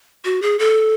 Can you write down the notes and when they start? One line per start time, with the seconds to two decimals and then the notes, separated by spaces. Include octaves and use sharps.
0.25 F#4
0.42 G#4
0.59 A4